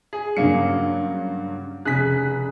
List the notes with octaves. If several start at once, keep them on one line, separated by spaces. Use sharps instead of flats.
G#4
G2 C#3 F#3 A#3 C#7
F1 C#3 G#4 F#6 B6